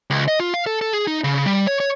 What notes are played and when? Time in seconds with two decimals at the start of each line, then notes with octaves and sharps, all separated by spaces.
0.10 C#2
0.28 D#5
0.40 F4
0.54 F5
0.66 A4
0.81 A4
0.93 G#4
1.07 D#4
1.24 C#3
1.46 G3
1.67 C#5
1.80 C#5